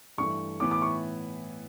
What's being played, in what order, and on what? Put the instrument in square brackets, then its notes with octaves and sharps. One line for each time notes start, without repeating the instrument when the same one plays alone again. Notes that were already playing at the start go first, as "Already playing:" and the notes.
[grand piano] G2 E3 A3 [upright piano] C#6
[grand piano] A2 E3 B3 [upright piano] D6
[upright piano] D6
C#6